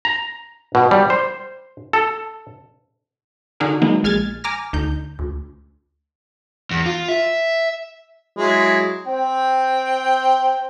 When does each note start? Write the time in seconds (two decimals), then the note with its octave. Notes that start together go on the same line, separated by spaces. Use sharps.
0.05 A#5
0.75 B2
0.91 G3
1.10 C5
1.93 A4
3.60 D3 D4 D#4 F#4 G#4 A#4
3.82 D#3 F#3 G#3 A#3 B3 D#4
4.04 A#1 G#3 F6 G#6 A6
4.44 G#5 A#5 D6 F6 A#6
4.73 D2 D#4 G6
5.19 D2
6.71 E2
6.86 F4
7.09 E5
8.37 F#3 G#3 E4
9.07 C4 G5